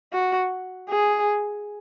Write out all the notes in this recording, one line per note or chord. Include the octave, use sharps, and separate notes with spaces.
F#4
G#4